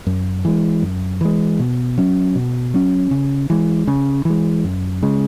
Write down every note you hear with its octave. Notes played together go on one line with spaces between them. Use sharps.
F#2
E3 G#3
F#2
E3 G#3
B2
F#3 C#4
B2
F#3 C#4
C#3
E3 G#3
C#3
E3 G#3
F#2
C#3 G#3